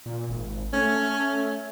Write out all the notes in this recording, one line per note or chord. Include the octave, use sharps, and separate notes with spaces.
A#2
G#1
A3 C#4